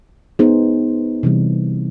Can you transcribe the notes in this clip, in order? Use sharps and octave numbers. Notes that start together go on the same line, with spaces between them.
B3 D#4 G#4 C5
C3 E3 G3